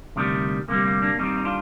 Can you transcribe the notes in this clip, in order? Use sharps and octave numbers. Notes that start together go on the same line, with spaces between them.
D2 C3 D#3 G3
D2 C3 D#3 G3 A#3
A#3
A#3 D4
D#2 D#3 G3 C4 D#4
D#4
D4 F4